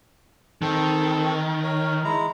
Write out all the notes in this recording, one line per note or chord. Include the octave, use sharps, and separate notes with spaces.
D#3 C4 A4
A#4 C#5
G#3 E4 A#5